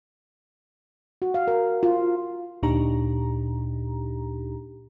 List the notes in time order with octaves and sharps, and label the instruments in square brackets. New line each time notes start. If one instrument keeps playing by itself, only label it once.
[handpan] F#4
F5
A#4
F4
[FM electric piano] D2 A#2 D4 D#4 G4 A#5